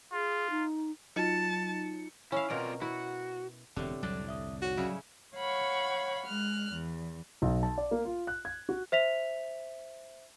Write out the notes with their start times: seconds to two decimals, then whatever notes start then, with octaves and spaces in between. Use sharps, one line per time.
0.12 F4 G#4
0.50 D#4
1.16 F#3 D#4 F4 A5 C#7
2.32 C#4 E4 F5
2.50 B2 C4 F4 A#4 D5
2.81 E4 F#4
3.76 E1 A2 D3 C4 G4
4.03 C2 F2 F#3 D4
4.27 G#1 E5 D#6
4.62 D#4 F#4 C#5
4.77 C#3 F#3 G3 C#4 E4 D5
5.35 C#5 F5 F#5 B5 C#6
6.25 G#3 F6 F#6
6.71 E2
7.42 B1
7.63 A5
7.78 D5
7.91 A#3
8.05 F4
8.27 F#6
8.45 G#6
8.69 F#4
8.92 C5 E5 B6 F7